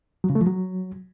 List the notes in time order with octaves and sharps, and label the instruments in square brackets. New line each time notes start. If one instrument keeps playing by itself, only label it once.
[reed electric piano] F#3
C#3
A3
F3
F#3